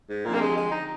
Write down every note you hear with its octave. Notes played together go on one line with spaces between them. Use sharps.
G#2
A#2 D3 F3 C4 G4
A#3
G#3
G#3
D#4